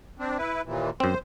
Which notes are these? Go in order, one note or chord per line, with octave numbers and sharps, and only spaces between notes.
C4 D4
E4 B4
D#2 A#2 E3
F#2 C4 C5